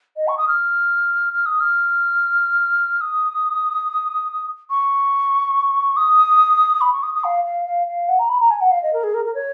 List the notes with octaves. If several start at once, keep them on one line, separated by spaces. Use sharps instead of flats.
D#5
C#6
D#6
F6
F6
D#6
F6
D#6
C#6
D#6
B5
C#6
D#6
D#6
F5
F5
F5
F5
F#5
A#5
B5
A#5
G#5
F#5
F5
D#5
A#4
G#4
A#4
A#4
C#5